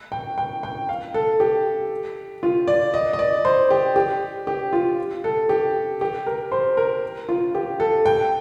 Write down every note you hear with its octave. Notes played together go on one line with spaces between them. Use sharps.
G5
G5
G5
F5
A4
G4
F4
D5
D#5
D#5
D5
C5
G4
G4
G4
F4
A4
G4
G4
A#4
C5
A#4
F4
G4
A4
G5